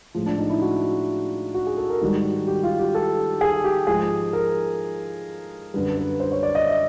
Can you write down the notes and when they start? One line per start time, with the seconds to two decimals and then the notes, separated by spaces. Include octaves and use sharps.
0.15 A2 F3 G#3
0.26 D4
0.38 D#4
0.50 E4
0.62 F#4
1.54 F#4
1.67 G#4
1.77 A4
1.90 A#4
2.01 G#2 D#3 G3 F#4
2.48 G4
2.63 F4
2.79 G4
2.95 A4
3.41 G#4
3.64 G4
3.87 G#2 F3 G#3 G#4
4.33 A#4
5.74 F#2 D3 G3 B4
5.97 B4
6.20 C5
6.32 C#5
6.43 D5
6.55 D#5
6.67 E5